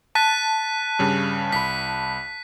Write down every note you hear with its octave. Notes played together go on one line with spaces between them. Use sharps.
A5 F#6 B6 D#7
G2 C#3 G3
C2 B5 B6